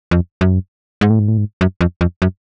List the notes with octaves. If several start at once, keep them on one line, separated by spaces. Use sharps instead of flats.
F2
F#2
G#2
A2
G#2
A2
G#2
F#2
F2
F2
F#2